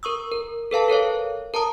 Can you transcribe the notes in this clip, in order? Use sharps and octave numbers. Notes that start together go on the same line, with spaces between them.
A#4 C#6 D#6 E6
A#4
A4 B4 F5 A5
A4 A#4 C#5 F5
A#4 A5 A#5 D#6